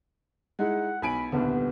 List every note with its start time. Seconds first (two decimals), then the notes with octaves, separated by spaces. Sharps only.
0.59 G#3 D#4 E4 F#5
1.02 B1 G#5 B5 D7
1.32 D#1 C2 D3 B3